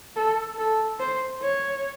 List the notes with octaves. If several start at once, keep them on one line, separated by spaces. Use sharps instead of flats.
A4
A4
C5
C#5